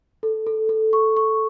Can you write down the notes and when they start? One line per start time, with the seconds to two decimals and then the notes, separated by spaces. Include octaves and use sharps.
0.23 A4
0.47 A4
0.69 A4
0.93 C#6
1.17 C#6